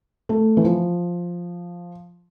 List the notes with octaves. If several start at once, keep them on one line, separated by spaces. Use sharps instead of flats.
A3
E3
F3